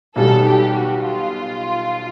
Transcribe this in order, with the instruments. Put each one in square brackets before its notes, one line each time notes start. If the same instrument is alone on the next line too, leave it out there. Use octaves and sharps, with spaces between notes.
[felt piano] B1 B2 G3 [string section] A4
[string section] G4
F#4
F4